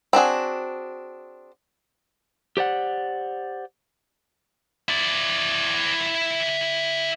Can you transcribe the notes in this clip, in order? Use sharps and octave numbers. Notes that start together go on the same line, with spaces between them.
C4 D4 F#4 G#4
G4 C5 D5 F#5
E4 D5